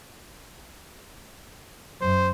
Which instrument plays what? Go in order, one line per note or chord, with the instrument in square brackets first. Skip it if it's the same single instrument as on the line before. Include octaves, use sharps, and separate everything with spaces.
[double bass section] F#2 [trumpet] C5